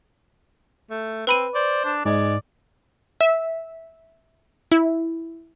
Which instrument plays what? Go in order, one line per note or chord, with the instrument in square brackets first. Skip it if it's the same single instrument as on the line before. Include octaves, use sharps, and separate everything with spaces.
[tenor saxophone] A3
[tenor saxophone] C4 [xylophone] B4 B5 D#7
[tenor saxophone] C5 [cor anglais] D5
[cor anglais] D4
[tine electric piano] G#2 [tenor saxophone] G#3 [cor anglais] D5
[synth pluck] E5
E4